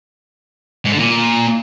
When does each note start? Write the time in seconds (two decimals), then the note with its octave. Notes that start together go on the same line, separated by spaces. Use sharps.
0.85 G#2
0.92 D3
0.99 A#2